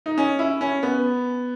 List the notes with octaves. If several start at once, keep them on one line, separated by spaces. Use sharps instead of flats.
D#4
C#4
E4
C#4
B3